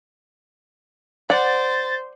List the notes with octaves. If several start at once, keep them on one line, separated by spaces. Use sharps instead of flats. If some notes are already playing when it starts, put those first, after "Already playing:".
C5 D5 F#5 A6